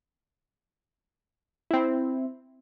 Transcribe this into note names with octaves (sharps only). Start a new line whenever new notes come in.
C4 E4